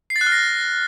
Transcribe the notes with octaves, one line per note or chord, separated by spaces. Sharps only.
C7
A6
F#6
F6
A#6